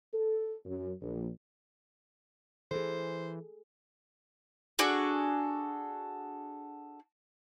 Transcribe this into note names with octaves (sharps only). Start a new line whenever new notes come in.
A4
F#2
A#1
E3 G#4 A4 C5
D4 F#4 G#4 A4